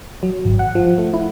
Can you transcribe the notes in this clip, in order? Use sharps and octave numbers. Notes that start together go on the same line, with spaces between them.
F#3
G#1
F#5
F3
A3
E4